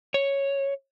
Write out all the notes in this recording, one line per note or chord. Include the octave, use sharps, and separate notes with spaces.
C#5